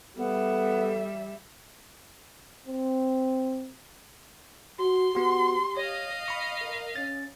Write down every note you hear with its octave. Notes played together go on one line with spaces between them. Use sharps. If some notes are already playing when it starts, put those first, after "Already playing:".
G3 B3 A4 E5
C4
F#4 C6
B3 F#4 G4
C#5 D#5 F5
B5 C#6
A#4
C#4 A6